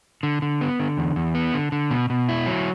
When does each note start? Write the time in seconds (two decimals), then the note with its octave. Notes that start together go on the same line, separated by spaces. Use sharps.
0.23 D3
0.42 D3
0.61 B3
0.80 D3
0.98 E2
1.16 E2
1.35 B3
1.54 D3
1.72 D3
1.91 B2
2.10 B2
2.29 E4
2.47 F#3